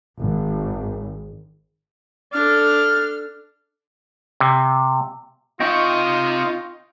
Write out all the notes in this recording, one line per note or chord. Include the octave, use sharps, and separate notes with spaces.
G#1
D4 A4 F6
C3
C4 D#4 F4 D#5 E5 G5 C#6